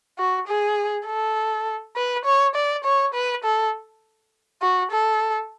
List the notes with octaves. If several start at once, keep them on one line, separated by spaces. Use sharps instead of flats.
F#4
G#4
A4
B4
C#5
D5
C#5
B4
A4
F#4
A4